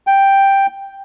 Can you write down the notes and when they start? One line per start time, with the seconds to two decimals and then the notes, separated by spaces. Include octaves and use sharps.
0.07 G5